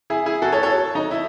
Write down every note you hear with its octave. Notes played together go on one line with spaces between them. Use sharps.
E4 G#4
E4 G#4
F#4 A4
A4 C#5
A4 C#5
D#4
E4